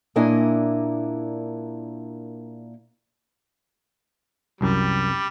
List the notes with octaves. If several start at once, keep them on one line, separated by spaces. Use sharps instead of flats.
A#2 A#3 D4 E4 D#5 G#5
C2 F#2 G3 G5